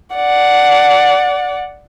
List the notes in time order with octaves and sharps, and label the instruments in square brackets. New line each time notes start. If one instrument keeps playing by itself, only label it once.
[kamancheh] D5 F#5